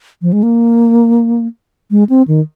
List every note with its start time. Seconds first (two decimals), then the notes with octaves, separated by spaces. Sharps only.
0.22 F3
0.33 G#3
0.43 A#3
1.91 G#3
2.09 C4
2.28 D#3